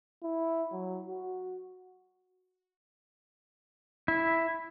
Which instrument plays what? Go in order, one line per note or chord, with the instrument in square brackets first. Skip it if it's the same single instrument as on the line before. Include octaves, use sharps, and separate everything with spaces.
[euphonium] E4
F#3
F#4
[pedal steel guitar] E4